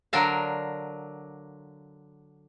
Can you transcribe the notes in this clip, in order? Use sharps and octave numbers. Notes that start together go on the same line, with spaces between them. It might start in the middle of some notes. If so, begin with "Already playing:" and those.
D3 F#3 D4 A#4 F5